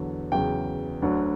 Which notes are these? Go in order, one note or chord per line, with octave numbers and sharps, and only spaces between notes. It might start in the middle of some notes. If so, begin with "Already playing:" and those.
Already playing: E2 D3 F#3
E2 C#3 F#3 G5
D2 D3 F#3